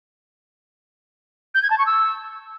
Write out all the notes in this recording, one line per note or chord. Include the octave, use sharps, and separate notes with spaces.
G6
G#6
A5
C#6
E6